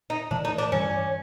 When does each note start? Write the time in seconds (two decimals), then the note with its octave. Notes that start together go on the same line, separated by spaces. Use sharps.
0.10 D#4
0.31 A2 E3 A3 D4
0.45 D#4
0.58 D4
0.72 G2 E3 G3 C#4